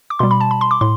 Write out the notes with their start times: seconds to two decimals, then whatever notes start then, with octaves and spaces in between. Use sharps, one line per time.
0.10 D6
0.19 B2 G3 C6
0.31 B5
0.40 A5
0.51 B5
0.61 C6
0.71 D6
0.81 A2 C6